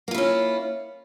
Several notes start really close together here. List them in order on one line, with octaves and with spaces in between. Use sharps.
A#3 F4 E4 C#4